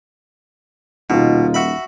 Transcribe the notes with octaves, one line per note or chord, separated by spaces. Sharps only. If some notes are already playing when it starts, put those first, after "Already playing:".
D#1 B2 D#4 F4
F#4 E5 B5